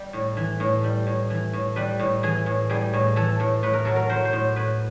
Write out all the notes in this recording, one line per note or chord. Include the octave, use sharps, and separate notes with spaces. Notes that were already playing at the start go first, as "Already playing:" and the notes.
Already playing: G3
A2
E3
A2
G3
A2
E3
A2
G3 B4
A2
E3 G#4
A2
G3 G#4
A2
E3 A4
A2
A2 B4
A#4
F#3 A4
A#4
F#3 C5
C5
A2
A2 B4